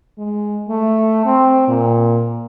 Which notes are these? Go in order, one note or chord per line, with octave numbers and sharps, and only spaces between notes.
G#3
A3
C4
A#2